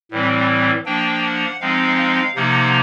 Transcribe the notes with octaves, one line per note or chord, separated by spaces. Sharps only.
A2 E3 G3 C4
F3 A#3 D4 G5
F#5
F3 G#3 C4 D#4 F5
F5
C3 F3 A#3 D#4 F#5